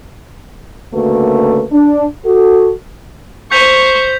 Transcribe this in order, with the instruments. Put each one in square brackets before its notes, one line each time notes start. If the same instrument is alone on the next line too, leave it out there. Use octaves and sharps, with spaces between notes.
[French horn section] D2 C#3 A3 A#3 F#4 B4
D4
F#4 A4
[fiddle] C5 [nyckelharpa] C#6 [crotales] G6 B6 F7